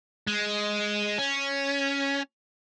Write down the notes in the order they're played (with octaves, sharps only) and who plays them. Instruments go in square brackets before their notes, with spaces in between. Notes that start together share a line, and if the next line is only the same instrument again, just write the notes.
[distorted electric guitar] G#3
C#4